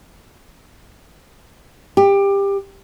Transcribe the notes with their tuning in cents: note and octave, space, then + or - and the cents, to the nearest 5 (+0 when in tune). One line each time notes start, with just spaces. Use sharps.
G4 +20